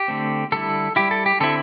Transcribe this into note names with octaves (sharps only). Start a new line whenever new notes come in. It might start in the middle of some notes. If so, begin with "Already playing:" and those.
Already playing: G4
D3 A3 C4
D3 G3 E4 A4
G3 E4 G4
A4
G4
D3 C4 E4 A4